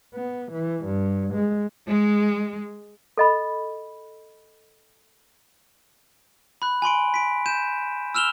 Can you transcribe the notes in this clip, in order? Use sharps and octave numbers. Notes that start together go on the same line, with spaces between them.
B3
E3
G2
G#3
G#3
A4 D#5 B5
B5 F#6
G#5 B5 C6 D7
B6 D7
G6 D#7 E7
E6 F6 E7 F7 G7